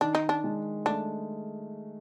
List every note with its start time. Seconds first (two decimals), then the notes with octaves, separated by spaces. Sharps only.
0.01 D#3 D4
0.15 D#4
0.29 D4
0.44 G#3
0.86 A3 D4